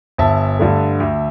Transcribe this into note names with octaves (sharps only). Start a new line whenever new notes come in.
G1 E5 A5
G2 D3 A3
D2